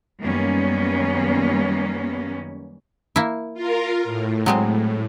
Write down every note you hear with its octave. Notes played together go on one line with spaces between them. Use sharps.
F#2 D#3 G3 A#3 B3 C#4
A#3 E4
F4 A#4
A2
F#3 G#3 C4